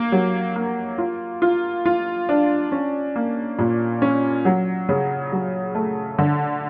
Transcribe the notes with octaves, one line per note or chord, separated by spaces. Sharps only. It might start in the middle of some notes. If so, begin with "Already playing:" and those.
Already playing: A#3
F#3
A#3
F4
F4
F4
D4
C#4
A#3
A#2
C#4
F#3
C#3
F#3
A3
D3